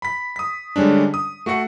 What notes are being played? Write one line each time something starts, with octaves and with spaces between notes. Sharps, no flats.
B5 B6
D#6 B6
D3 G3 G#3 C#4 D4
D#6
A3 F#4 A4 F#5 C#7